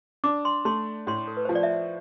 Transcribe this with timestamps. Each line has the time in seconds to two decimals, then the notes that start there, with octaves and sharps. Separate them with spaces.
0.24 D4 D6
0.45 C6
0.65 A3 C6
1.07 A2 C6
1.27 A4
1.37 B4
1.45 F3 C5
1.55 D5
1.63 E5